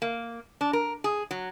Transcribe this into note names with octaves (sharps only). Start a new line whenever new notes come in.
A#3
D4
A#4
G#4
F#3